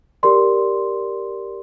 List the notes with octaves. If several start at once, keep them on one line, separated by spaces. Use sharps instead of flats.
G4 A#4 D5 C6